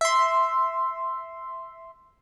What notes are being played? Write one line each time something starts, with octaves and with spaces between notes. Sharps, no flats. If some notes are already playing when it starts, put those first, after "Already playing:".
E5 C6